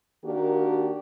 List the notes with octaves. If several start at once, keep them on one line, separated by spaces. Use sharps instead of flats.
D#3 A#3 D4 F#4 G4 A#4